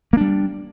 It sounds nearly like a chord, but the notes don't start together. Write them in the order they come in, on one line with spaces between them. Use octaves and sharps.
A#3 D4 G3